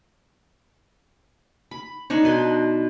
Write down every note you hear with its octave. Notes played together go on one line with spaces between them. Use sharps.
B5
D4 D#4 C#5
B2 B4 C6